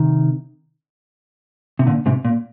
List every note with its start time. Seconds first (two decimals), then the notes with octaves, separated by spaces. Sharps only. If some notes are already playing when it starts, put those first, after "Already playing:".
Already playing: C3 D#3
1.79 C3
1.87 A#2 D3
2.06 G#2 C3
2.25 A#2